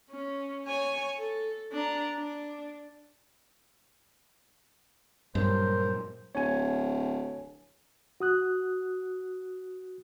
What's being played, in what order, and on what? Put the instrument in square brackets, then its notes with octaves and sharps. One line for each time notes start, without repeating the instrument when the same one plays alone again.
[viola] C#4
C#5 G#5
A4
D4 A#5
D4
[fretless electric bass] G2 [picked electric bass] A#2 F#3 G#3 [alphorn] A#4 [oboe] C5
[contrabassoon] D1 [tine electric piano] C#5 G#5
[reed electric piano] F#4 D#6 F#6